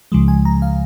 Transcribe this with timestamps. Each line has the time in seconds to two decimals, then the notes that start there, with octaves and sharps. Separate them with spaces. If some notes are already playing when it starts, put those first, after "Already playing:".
0.12 C#2 C#3 F3 G#3
0.28 G#5
0.45 A#5
0.62 F5